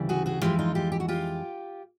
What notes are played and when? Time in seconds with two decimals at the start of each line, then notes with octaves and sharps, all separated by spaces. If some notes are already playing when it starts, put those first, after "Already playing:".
Already playing: D2 C#3 E3 G3
0.09 F#4 G#4
0.26 F#4 G#4
0.42 F2 C3 E3 G#3 F4 G4
0.59 D#4 F4
0.75 F4 G4
0.92 G4
1.00 F#4
1.08 F4 G4